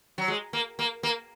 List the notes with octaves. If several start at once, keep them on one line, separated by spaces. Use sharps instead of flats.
F#3
G#3
A#3
A#3
A#3